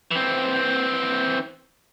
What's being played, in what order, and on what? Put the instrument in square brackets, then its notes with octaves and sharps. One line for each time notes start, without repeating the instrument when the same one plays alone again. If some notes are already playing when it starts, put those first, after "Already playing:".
[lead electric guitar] E3 C4